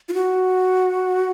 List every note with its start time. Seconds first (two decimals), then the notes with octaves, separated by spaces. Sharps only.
0.09 F4
0.14 F#4